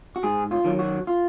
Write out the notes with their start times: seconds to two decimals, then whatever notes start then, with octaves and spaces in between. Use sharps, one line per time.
0.16 F#4
0.23 G#2 G#4
0.51 F4
0.64 D#3 F#3
0.79 F#4
1.07 F4